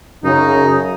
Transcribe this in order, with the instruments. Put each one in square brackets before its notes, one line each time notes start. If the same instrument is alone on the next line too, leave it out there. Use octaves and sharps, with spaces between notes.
[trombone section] F#2 C#3 [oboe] D#4